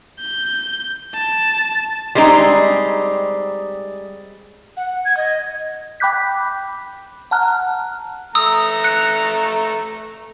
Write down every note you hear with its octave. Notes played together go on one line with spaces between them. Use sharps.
G6
A5
G3 G#3 C4 D#4
F#5
G#6
D#5
G5 B5 D6 F#6 G6 B6
F#5 A5 A#5 F6 F#6
A3 A#5 D#6 E6
F#6 C#7